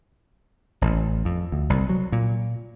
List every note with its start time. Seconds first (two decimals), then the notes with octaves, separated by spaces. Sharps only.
0.82 A1
1.25 F2
1.52 D2
1.70 C2
1.89 F#3
2.12 A#2